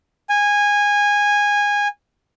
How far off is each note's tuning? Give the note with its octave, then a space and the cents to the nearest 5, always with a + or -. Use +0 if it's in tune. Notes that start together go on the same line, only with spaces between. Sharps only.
G#5 -15